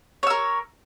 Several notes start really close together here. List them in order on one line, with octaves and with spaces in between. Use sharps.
C#5 E6 A#4